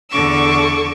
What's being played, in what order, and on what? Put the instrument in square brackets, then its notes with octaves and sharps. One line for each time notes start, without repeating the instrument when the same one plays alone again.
[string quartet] E2 D3 A4 C#6 D6 E6